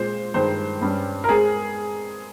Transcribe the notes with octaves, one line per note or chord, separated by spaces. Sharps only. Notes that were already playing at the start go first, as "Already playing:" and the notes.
Already playing: A#2 G#3 C4 C5
G2 D#3 G#3 C5
G2 G3 C#4
A#4
G#3 C4 G#4